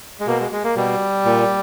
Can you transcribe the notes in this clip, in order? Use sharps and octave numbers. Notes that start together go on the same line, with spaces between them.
G#3
B2 A#3
G#3
G#3
A#3
B2 G3
A#2